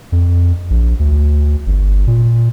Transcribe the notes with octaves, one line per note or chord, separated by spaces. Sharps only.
F2
A#1
D2
G1
A#2